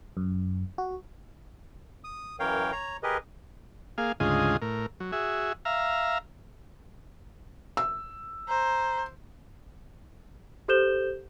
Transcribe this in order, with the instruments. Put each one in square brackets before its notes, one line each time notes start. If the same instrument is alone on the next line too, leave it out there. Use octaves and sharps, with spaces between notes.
[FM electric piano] F#2
F#4
[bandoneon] D#6
F#2 E3 A#4 C#5 F5 G5
C#5 A#5
G4 G#4 A#4 B4 D#5
[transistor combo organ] A#3 G#4 F5
D2 G#2 C#3 F4 G#4 D#5
A2 A#4
F#3
F#4 G#4 E5
E5 F5 A#5
[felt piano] E6
[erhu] C5 [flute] A#5
[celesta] G4 A4 C5 G6 E7 G7